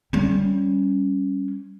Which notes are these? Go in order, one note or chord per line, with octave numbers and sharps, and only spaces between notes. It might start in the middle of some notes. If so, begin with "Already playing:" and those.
G3 C#4